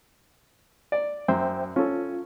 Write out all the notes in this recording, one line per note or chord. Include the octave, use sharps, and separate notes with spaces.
D5
F#2 C5 E5 G5
C#4 F4 A4